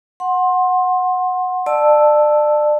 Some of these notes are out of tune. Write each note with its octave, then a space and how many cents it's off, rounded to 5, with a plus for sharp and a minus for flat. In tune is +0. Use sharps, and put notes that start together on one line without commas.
F#5 -10 C6 +20
D5 +30 A5 +0 E6 +0